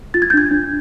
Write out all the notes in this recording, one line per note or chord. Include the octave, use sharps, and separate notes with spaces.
F4 A6
G#6
G6
D4 G#6
D4